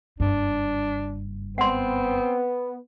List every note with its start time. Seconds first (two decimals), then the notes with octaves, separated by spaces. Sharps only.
0.20 F#1 G2 D4
1.58 B3 C4 F#5 C6